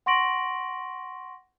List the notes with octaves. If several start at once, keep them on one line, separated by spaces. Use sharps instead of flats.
F#5 C6 C#6 A#6 D7 F#7